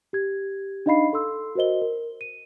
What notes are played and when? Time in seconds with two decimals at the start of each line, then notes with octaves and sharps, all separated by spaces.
0.13 G4 G#6
0.86 D4 D#4 D#5 F5 B5 C7
1.13 A4 C6 E6
1.55 F#4 A#4 C5 D#5 G7
1.82 A#4
2.21 D#7